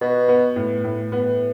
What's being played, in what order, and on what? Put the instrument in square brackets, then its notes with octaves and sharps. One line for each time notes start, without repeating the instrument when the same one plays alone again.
[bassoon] B2 [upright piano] B3
[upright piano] B3
A2
A2
B3